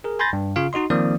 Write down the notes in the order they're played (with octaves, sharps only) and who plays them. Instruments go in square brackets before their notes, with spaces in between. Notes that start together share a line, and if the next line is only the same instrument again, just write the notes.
[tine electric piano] G#4 A#4
G#5 B5 C6 G6 A6 A#6
G2
C#3 F4 F5
D#4 F#4 D#5 C6
D#3 F3 A#3 C4 D5 D#6